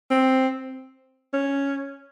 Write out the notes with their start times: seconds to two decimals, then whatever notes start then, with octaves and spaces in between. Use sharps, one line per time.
0.11 C4
1.34 C#4